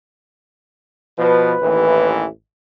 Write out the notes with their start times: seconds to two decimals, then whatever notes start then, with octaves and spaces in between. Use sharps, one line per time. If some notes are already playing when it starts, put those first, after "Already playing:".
1.17 B2 F3 B4
1.62 A1 D#2 E3